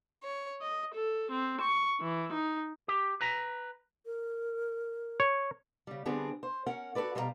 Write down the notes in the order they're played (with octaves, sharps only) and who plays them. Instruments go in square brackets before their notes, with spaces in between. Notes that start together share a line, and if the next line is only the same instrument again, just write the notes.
[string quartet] C#5
D#5
A4
C4
C#6
E3
D#4
[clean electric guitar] G4
B4 A#5
[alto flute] A#4
[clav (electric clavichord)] C#5
[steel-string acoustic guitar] C#3 G3
D3 G3 B3 C4 D4 G#4
C5
C#4 A#4 F#5
F#4 G4 A4 B4 D5
B2 G3 A4 C5 F5 A#5